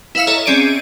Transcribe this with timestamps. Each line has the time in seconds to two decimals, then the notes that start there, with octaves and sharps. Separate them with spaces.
0.15 E4 B4 E5 F5 E6 C#7
0.27 A4 C#5 D#5 E5 A#5
0.46 C4 C#4 G#4 D5 D7 D#7